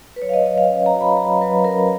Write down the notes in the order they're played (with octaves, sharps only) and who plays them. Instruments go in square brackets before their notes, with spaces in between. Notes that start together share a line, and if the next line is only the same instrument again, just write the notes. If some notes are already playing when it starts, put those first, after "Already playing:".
[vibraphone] B4
F#3 C#5
F5
D#5
F#3 D#5
F5
C#4
A#5
F#4
B5
F#3 A#5
F#3 B4
C#4 A#4